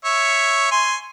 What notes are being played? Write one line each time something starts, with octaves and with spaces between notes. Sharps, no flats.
C#5 E5
G#5 C6